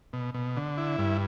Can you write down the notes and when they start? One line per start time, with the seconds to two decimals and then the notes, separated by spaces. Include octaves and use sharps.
0.13 B2
0.34 B2
0.57 D3
0.78 E4
0.98 G2